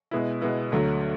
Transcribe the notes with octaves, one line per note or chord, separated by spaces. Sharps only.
B2 G#3 B3 E4
B2 G#3 B3 E4
D2 D3 F#3 A3